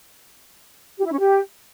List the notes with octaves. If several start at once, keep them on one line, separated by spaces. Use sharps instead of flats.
G4
E4
C#4
G4